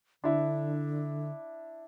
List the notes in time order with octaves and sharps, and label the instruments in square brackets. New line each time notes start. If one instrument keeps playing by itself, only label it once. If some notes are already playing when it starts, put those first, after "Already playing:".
[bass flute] D3 [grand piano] D4 E4